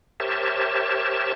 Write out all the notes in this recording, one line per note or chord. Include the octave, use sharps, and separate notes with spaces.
G4 A#4 C5 C#5 E5 A5